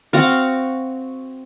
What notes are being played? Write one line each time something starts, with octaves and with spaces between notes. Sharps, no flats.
C4 F#4 F5